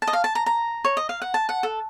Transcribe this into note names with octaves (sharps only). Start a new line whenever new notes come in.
A5
D#5
F5
A5
A#5
A#5
C#5
D#5
F5
F#5
A5
F#5
A4